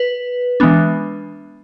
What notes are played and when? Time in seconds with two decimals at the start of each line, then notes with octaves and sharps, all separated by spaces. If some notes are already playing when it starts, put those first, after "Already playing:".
Already playing: B4
0.60 E3 G#3 B3 D4